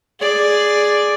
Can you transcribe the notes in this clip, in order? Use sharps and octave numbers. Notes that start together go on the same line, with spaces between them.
G#4 D5